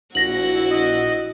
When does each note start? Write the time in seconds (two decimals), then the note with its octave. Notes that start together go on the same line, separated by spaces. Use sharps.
0.15 A#1 E4 F#4 A#6 F#7
0.71 D#5